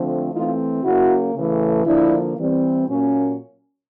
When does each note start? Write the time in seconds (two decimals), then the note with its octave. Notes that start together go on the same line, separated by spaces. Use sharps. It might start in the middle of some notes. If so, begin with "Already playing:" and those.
Already playing: D3 F3 A3 C4
0.33 E3 A3 C4 D#4 F4
0.83 C#3 F#3 A#3 E4 F#4
1.35 C#3 E3 A3
1.86 D3 F3 A#3 D4 E4
2.36 E3 G3 C4
2.87 A#2 F#3 A#3 C#4